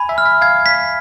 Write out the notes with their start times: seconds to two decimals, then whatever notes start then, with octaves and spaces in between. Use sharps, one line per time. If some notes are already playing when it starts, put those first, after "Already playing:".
Already playing: G#5 B5
0.09 E5
0.18 F6
0.25 E5
0.42 F5 G#6
0.66 B6